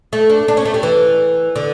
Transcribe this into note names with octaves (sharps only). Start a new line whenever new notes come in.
A3
D4
D4
C#4
A3
G3
E3
D3